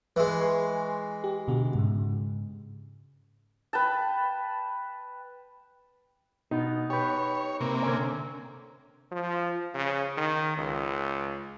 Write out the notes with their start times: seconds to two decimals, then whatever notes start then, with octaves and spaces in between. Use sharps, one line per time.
0.16 E3 G#3 B4 E5
0.41 G#5 C6 C#6
1.24 G4
1.48 B2 D3 F#4
1.75 G#2 C#3
3.73 B4 G5 A5
6.51 B2 B3 D#4
6.90 G4 B4 C#5
7.60 C3 A#3
7.82 D3 C4 C#4
9.12 F3
9.75 C#3
10.17 D#3
10.58 C#2